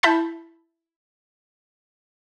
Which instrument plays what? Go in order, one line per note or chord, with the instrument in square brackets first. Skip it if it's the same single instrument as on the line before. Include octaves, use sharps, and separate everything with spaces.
[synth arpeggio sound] E4 A5 B5 G6 B6